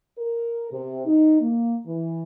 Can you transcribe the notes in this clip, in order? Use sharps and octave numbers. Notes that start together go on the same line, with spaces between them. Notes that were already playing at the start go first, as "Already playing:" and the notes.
A#4
C3
D#4
A#3
E3